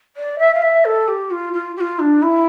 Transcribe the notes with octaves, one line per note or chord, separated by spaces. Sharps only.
D5
E5
F5
E5
A4
G4
F4
F4
G4
F4
D4
E4